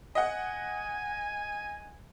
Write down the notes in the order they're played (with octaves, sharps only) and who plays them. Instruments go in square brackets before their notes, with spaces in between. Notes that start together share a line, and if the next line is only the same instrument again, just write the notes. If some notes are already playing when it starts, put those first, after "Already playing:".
[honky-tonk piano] D#5 F#5 [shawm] G#5